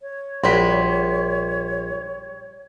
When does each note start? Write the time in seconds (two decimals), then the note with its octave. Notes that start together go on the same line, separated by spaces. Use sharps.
0.01 C#5
0.44 A#1 G3 F#4 C6 B6